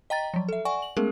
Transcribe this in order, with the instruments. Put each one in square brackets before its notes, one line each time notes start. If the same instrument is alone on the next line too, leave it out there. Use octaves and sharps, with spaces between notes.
[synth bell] D#5 G5 A#5 A6
F3 F#3
A4 E5
D5 F#5 G#5 C#6
F#7
G#3 A3 B3 C#4 G#4 A#4